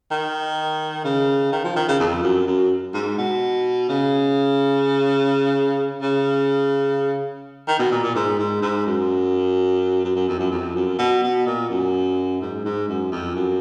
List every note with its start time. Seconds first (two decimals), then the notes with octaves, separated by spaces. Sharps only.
0.11 D#3
1.05 C#3
1.53 D#3
1.64 F3
1.76 D#3
1.88 C#3
2.00 F2
2.23 F#2
2.47 F#2
2.94 G#2
3.18 B2
3.89 C#3
6.02 C#3
7.68 D#3
7.79 B2
7.91 A#2
8.03 A#2
8.15 G#2
8.39 G#2
8.62 G#2
8.86 F#2
10.05 F#2
10.16 F#2
10.29 F2
10.39 F#2
10.51 F2
10.75 F#2
10.98 B2
11.22 B2
11.46 A#2
11.70 F#2
12.41 G#2
12.65 G#2
12.88 F#2
13.11 F2
13.36 F#2